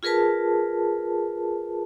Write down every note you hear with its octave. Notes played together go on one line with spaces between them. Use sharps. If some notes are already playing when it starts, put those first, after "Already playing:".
F4 G#4 A#4 B4 A5